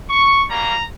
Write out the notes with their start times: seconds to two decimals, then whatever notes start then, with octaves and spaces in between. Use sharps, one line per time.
0.10 C#6
0.48 G3 A#3 C#4 F#4 A#5